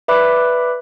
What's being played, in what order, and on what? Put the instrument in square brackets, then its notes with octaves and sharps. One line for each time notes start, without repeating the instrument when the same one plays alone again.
[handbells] B4 D5 E5 B5 D6 F#6